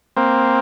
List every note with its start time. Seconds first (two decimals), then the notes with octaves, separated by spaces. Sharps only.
0.16 A#3 C4